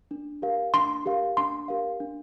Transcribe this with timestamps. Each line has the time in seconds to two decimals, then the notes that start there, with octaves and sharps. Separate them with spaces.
0.11 D4
0.42 G4 A#4 F5
0.74 D4 C6
1.06 G4 A#4 F5
1.37 D4 C6
1.68 G4 A#4 F5
2.00 D4